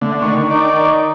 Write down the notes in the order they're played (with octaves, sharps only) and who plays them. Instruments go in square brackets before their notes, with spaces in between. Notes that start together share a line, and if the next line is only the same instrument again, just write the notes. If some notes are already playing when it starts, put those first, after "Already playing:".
[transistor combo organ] D3 [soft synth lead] A3
[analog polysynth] D#3 [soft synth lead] C#6
[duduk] D#4 [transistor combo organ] D5